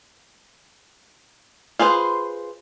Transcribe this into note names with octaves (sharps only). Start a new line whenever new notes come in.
F4 G#4 B4 C5